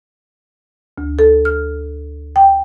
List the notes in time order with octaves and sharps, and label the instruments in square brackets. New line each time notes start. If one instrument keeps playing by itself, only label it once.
[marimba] D2
A4
F6
G5